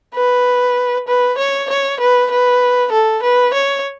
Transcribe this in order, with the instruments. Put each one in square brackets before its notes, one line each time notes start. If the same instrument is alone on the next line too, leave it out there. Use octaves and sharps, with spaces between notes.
[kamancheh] B4
B4
C#5
C#5
B4
B4
A4
B4
C#5